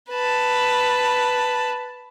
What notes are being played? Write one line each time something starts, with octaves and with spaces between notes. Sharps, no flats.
B4 A5